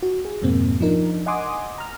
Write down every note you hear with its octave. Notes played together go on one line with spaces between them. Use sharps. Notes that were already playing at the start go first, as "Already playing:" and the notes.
F#4
G#4
F2 G#2 B2 A#3 C4
F3 D4 D#4 A#4
D#5 F#5 G#5 C6 D6 D#6
A#5 F6